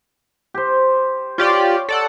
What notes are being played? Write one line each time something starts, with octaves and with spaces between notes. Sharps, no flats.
G4 C5
F4 G4 C#5 D5
A4 D5 F#5